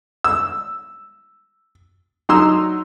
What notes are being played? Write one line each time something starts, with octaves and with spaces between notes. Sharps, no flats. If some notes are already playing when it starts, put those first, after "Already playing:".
E6
F#3 D#4 C6 D#6 E6